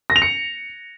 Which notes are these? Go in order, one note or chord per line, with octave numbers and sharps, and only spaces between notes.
A#6
F7
C#7